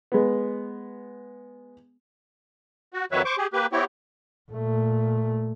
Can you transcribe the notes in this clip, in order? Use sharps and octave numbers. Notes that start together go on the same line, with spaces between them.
G#3 B3
F#4
F2 D#3 F#3 B4 C#5 E5
C5 C#6 D6
G4 G#4
A#3 G4 B4
B3 C4 E4 G4 C#5
A#2 A3